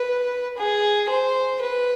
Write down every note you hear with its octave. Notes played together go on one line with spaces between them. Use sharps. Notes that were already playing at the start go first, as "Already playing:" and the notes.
Already playing: B4
G#4
C5
B4